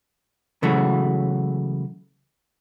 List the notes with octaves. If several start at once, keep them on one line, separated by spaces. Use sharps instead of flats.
C#3 E3 F#3 G#3 A3 F#4